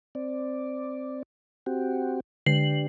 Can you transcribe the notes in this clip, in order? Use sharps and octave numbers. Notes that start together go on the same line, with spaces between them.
C4 D5
C4 F#4 G4
D3 D4 G4 C7 F#7